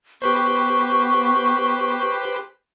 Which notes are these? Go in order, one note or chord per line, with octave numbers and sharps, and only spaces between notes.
B3 G4 B4 C5 C#6